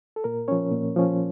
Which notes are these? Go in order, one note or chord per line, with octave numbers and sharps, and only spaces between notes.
A4
A#2 A#4
F3 C#4 C#5
A#2
F3 C#4